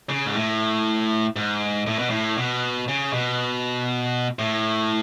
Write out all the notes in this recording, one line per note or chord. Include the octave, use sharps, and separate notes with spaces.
C#3
G#2
A2
G#2
A2
B2
A2
B2
C#3
B2
A2